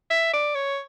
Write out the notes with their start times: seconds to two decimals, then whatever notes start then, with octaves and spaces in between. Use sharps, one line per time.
0.11 E5
0.33 D5
0.55 C#5